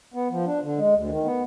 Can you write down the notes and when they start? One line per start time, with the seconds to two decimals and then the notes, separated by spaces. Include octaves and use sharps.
0.14 B3
0.31 F3
0.46 D4
0.62 D3
0.77 G#3
0.93 D2
1.09 D#3
1.25 B3